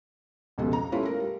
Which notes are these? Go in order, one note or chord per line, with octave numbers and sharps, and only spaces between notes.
F1 C#2 B2 G3 A4
A#5
G3 A3 C#4 E4 F4
A#4
G3